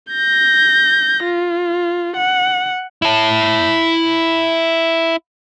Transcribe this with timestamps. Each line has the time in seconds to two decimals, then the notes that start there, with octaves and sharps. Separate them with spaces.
0.11 G6 A#6
1.24 F4
2.16 F#5
3.02 E4 A5